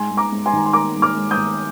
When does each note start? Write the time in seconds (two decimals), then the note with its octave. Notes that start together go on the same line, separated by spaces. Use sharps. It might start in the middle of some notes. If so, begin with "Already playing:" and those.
Already playing: G#2 G#5 C6
0.10 G#2
0.17 A#5 D6
0.32 G#2
0.46 G#5 C6
0.53 D#3 A#5
0.65 C6
0.73 A#3 A#5 D6
0.95 G#2
1.02 D6 F6
1.17 G#2
1.31 D#6 G6
1.37 D#3